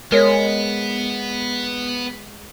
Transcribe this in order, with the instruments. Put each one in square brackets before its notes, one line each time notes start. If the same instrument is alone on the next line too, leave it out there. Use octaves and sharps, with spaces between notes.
[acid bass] G#3 [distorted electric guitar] B3 [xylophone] A#4 C#5